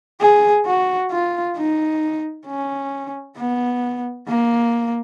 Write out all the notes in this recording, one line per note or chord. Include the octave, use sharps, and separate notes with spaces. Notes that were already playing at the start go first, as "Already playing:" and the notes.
G#4
F#4
F4
D#4
C#4
B3
A#3